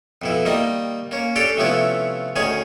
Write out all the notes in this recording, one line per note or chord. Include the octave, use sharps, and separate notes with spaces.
F2 B2 E4
D#3 G3 A#3 D#5
A#3 C#4
C#4 D4 G4 A4 G5
C3 F3 A3 B3 C#4 E4
D2 D#3 C#4 G#4 G#5